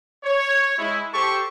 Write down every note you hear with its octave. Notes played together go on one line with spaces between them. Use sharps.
C#5
G#3 E4
G4 A4 C5 A5 C#6